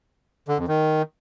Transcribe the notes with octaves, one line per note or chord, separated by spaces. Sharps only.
D3
F2
D#3